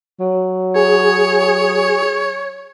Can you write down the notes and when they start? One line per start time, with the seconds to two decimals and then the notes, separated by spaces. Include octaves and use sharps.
0.20 F#3
0.75 G#4 C#5